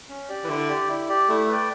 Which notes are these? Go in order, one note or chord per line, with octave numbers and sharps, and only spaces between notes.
C#4
G4 D5
E3
D3 E4
G4 D5
E4
G4 D5
A3 E4
B4 D5 G5